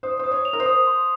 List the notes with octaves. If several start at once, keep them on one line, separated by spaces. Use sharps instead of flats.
C5 D#6
C5 D#6
C#5
F7
A#4
C5
D#6
C6